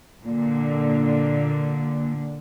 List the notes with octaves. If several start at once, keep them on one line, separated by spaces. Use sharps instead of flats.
A#2 D3